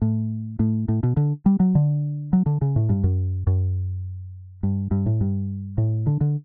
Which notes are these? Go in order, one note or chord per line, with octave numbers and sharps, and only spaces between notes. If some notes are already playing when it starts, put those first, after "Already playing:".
A2
A2
A2
B2
D3
G3
F#3
D3
F#3
D3
C#3
A2
G2
F#2
F#2
G2
G2
A2
G2
A2
D3
D3